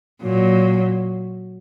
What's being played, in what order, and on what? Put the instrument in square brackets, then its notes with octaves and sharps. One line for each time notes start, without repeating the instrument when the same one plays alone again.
[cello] A#2 [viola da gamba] F#3